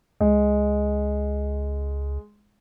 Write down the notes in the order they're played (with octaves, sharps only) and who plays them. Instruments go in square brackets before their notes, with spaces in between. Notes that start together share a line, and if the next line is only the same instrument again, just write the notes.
[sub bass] C#2 [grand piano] G#3